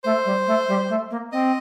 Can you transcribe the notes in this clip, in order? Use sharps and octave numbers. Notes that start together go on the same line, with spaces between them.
A3 C5
G3
A3
G3
A3
A#3
C4 D#5